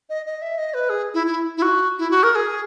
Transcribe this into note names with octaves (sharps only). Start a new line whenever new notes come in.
D#5
D#5
E5
D#5
B4
G#4
E4
E4
E4
F#4
E4
F#4
A#4
G#4